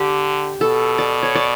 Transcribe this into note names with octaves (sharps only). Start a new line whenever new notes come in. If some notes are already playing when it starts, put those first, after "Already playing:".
Already playing: D3 G4
B2 A4
D5
C#5
D5